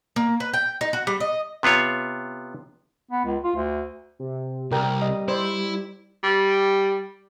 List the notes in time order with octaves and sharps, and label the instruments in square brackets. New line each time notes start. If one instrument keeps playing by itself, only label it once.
[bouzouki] A#3
B4
G5
D#4
F#4
G3
D#5
[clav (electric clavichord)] C3 B3 F4 C#5
[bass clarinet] B3
C#2
F4
D2
[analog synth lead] C3
[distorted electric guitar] C2 [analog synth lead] G3 [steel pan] G4 A#4 G5
[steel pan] D#5
[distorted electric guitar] E4 [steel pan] C5 D5
[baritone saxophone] G3